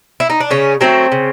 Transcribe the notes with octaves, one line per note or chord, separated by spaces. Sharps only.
E4
D#4
D4
C#3 C#4
F#3 A3 C4
C#3